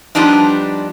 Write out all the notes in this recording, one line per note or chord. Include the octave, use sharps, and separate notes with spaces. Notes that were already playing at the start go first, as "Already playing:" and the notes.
F3 G3 B3 D4 D#4